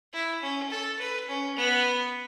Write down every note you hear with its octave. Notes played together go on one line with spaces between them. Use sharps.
E4
C#4
A4
B4
C#4
B3